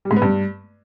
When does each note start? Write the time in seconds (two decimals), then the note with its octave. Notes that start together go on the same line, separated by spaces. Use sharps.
0.05 G3
0.11 G#2
0.16 B3
0.22 G2